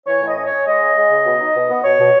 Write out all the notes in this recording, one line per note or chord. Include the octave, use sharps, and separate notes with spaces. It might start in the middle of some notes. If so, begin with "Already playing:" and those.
E3 C#5
A2 D#5
C#4
C#5
C#4
G#3 D#5
C#3
G#3
C#3
B2
D#4
B2
B3
B2 C#5
B2